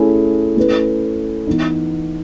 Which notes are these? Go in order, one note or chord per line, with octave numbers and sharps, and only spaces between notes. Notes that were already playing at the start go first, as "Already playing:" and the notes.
Already playing: A3 C#4 E4 G#4
A3 C#4 E4 B4
E3 B3 D#4